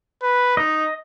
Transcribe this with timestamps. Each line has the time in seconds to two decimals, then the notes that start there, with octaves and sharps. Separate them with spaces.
0.23 B4
0.57 D#4 D#5